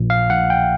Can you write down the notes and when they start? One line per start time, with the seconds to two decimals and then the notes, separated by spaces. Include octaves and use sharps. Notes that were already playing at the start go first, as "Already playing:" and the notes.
Already playing: A#1 A#2
0.10 F5
0.30 A#1 F#5
0.50 G5